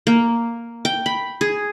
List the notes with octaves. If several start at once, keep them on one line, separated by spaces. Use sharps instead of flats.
A#3
G5
B5
G#4